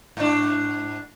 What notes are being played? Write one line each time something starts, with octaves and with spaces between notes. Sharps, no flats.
G#2 D4